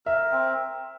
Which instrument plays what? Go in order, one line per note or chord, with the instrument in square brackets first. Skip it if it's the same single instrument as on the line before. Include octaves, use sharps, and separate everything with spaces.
[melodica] A#4 [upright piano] E5
[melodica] C4